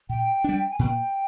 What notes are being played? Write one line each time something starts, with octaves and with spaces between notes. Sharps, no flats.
A#2 G5
G3 D4
G#5
A#2 G5